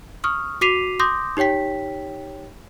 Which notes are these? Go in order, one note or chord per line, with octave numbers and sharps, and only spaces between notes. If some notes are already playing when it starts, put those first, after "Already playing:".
C#6 D#6 F6
F#4 D6 B6 C7 D#7 F7
C6 D6 D#6 G6 A#6
D#4 G4 C#5 G5 B6